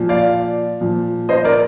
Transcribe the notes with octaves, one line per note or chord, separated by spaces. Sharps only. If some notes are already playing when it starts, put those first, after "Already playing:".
Already playing: A#2 F3
D5 F5
A#2 F3
C5 D#5
A#4 D5